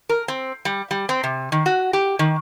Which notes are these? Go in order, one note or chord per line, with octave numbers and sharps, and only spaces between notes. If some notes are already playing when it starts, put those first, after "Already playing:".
A#4
C4
G3
G3
C4
C3
D#3
F#4
G4
D#3